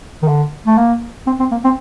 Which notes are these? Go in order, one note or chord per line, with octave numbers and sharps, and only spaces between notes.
D#3
D3
A3
A#3
C4
C4
A#3
C4